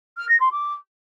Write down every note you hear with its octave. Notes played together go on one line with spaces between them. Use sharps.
F6
A#6
C6
D6